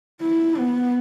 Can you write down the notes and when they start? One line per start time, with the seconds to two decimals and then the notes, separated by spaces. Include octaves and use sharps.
0.22 E4
0.58 B3